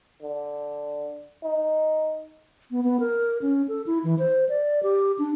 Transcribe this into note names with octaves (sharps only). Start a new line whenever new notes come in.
D3
D#4
B3
B3
A#4
C#4
A4
E4
E3
C5
D5
G4
D4